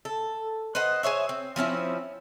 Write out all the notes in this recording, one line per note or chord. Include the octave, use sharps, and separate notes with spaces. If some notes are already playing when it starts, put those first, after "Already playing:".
A4
B4 C5 D#5 F#5
G#4 C5 C#5 E5
C4
F3 C4 C#4 E4